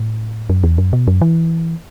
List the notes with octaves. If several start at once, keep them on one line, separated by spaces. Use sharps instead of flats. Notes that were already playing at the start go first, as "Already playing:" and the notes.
Already playing: A2
F#2
E2
F#2
B2
F#2
E3